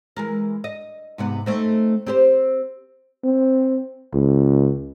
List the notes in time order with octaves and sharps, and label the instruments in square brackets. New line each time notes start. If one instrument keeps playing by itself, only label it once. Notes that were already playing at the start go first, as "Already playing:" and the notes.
[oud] E3 G#3 A#4
D#5
G#2 C3 B3
A3 C4 D#4
C4 G4 C5
[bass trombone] C4
C#2